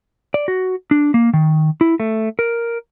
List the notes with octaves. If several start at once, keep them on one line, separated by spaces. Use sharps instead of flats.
D5
F#4
D4
A#3
D#3
E4
A3
A#4